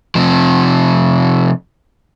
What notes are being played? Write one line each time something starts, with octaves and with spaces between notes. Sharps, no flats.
C3 F3